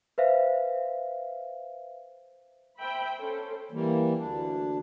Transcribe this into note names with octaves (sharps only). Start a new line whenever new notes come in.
B4 C5 E5 F5
C5 E5 G5 B5
C#4 A4 C5
E3 G3 A#3
D2 D4